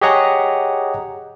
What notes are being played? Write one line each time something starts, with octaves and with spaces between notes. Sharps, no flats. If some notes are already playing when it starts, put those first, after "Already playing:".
G4 G#4 C#5 D#5 F#5 A#5